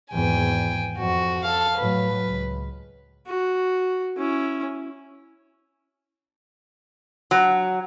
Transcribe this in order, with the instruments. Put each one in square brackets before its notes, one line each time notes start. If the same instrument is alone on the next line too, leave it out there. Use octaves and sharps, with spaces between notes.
[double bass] G#1 E2 [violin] G5 G#5
[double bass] F2 [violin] F#4
[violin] A4 F5
[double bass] A2 F#3 [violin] B4
[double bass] C#2
[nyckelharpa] F#4
C#4 E4
[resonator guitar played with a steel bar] F#3